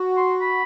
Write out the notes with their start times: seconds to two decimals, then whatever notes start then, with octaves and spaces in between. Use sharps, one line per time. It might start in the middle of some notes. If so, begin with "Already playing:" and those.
Already playing: F#4
0.17 C6
0.41 B5